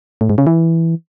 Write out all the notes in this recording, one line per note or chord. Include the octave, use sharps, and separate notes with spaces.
A2
G#2
C#3
E3